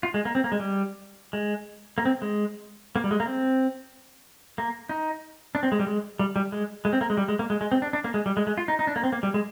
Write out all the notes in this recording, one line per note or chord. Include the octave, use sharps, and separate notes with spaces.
F4
G#3
A#3
C4
A#3
G#3
G3
G#3
A#3
C4
G#3
A#3
G3
G#3
A#3
C4
A#3
D#4
D4
C4
G#3
G3
G#3
G3
G3
G#3
G#3
C4
A#3
G#3
G3
G#3
A#3
G#3
G#3
C4
D4
D4
A#3
G#3
G3
G#3
G#3
F4
D#4
D#4
D4
A#3
C4
A#3
G3
G#3